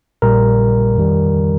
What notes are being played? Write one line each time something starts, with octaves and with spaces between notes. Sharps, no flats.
A#1 A#2 G3 A#4
F2 D#3 G3